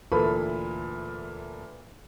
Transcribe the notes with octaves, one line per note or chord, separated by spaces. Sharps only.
D2 A#2 E3 A#3 A4 B5